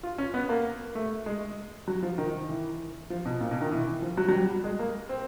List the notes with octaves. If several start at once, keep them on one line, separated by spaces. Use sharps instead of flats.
F4
C#4
B3
A#3
A3
G#3
F#3
F3
D#3
E3
F3
B2
A#2
B2
D#3
E3
F3
F#3
F#3
G3
G#3
A#3
C4